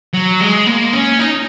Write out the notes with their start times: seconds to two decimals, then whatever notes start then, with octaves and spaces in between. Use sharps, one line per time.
0.13 F#3
0.41 G#3
0.67 A#3
0.93 C#4
1.19 D#4